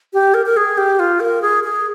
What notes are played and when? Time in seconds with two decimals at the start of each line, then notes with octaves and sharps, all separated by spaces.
0.13 G4
0.34 A#4
0.46 A#4
0.57 G#4
0.78 G4
0.99 F4
1.20 A#4
1.42 G#4
1.64 G#4